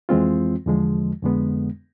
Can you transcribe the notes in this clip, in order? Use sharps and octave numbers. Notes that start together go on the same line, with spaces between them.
F2 E3 G#3 C4 F4
E2 D3 F3 G#3
F2 D3 G#3 B3